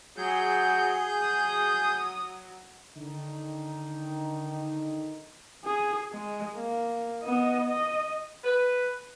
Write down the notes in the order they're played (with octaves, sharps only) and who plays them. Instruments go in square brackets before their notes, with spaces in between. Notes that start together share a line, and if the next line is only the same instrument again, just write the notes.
[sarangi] F#3 [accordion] G#4 G6
[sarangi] F#3 [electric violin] D#6
[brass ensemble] D3 D#3 D#4
[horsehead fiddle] G#4
G#3
A#3
B3 D#5
D#5
[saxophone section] B4